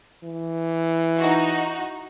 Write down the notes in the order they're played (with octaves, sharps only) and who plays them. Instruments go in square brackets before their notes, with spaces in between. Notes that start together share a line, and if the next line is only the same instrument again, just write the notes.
[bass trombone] E3
[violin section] D#4 F#4